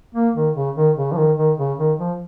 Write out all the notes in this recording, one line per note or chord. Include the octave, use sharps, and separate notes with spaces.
A#3
D#3
C#3
D#3
C#3
F3
D#3
D#3
C#3
D#3
F3